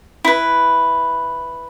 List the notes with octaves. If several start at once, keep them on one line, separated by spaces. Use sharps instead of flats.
E4 B4